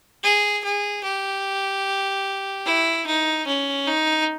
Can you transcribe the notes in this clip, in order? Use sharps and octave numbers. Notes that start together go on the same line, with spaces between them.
G#4
G#4
G4
E4
D#4
C#4
D#4